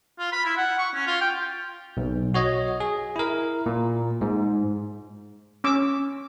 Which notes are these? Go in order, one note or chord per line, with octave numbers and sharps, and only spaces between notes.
F4
B5
E4
F#5
C#6
C#4
F4
G5
B1
F#4 C#5 D#5
G#4
E4 A#4
A#2
G#2
C#4 D6 E6